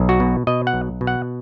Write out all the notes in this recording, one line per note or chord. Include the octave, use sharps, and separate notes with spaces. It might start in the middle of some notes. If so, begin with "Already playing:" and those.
Already playing: B1
F#4
B2
B2 D#5
F#5
B1
B2
F#5